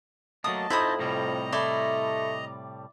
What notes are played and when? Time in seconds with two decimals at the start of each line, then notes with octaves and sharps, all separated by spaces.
0.44 F#3 A3 A#3 D#5 A5 D#6
0.70 F2 D#4 E4 C5 E5 B5 D#6
0.99 A2 C3 G3 D#5 A#5
1.52 A3 E4 D5 C6